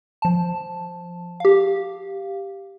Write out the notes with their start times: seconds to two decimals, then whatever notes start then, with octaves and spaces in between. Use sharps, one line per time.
0.22 F3 A5
1.40 G4 F5